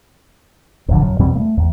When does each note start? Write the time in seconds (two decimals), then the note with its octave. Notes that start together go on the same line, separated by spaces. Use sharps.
0.88 D1 B1 F2 D3
1.02 F#2
1.19 E2 B2 G3 C4
1.35 A3 A#3
1.57 E2